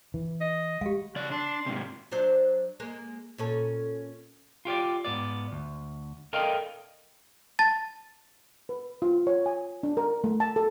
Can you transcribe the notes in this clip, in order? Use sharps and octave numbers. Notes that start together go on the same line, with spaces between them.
E3
D#5
G#3 G4 F5
C#3 F#4 D5
D4 C6
G#2 C3
F#3 D4 C5
G#3 A#3
A#2 C#4 A4
F4 G4 C#5 D5
G#2 B3 D5
D2
A4 A#4 D5 D#5 F5 G5
A5 A6
B4
F4
C#5
G#5
D4
A#4
A3
A5
A4